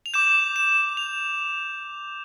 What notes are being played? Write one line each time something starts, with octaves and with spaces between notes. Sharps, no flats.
F7
D6 G6 E7
E7
F7